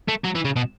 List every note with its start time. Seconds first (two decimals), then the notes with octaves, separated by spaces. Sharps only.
0.08 A3
0.24 F#3
0.35 E3
0.45 C#3
0.56 B2